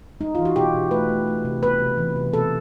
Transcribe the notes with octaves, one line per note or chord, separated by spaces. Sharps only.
G#3 D#4
E3 F4
F#4
B2 G4
B2
A3 B4
A3
A3
C3
B3 B4
C3
E3
C3
B2 A4